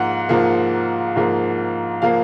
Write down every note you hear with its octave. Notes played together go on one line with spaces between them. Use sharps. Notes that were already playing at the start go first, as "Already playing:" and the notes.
Already playing: G#2 F3 A#3 F#5
G#2 F3 A#3
G#2 F3 A#3
F3 A#3 F5